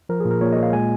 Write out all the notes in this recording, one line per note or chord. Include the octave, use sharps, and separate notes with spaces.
F3 A#4
G#4
A#2
A#4
A#2 C#5
D#5
A#2
F5
G#3 G#5